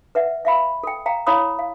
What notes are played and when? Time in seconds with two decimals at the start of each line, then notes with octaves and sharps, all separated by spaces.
0.15 B4 E5 F#5
0.45 E5 F5 B5
0.83 A4 G5
1.06 F5 G5 A#5
1.27 E4 C#5 F5 A#5 B5 D#6
1.59 F5